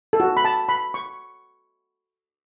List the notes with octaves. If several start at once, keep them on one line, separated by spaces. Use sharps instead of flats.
A4
F#4
B5
A5
B5
C#6